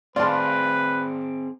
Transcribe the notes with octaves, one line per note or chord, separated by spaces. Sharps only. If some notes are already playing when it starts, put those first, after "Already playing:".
C4 F4 G#4 B4 D5 A5